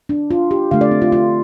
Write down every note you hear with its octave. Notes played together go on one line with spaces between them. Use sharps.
D4
F4
G4
D3 A3 F5
D5
C4
F4
F4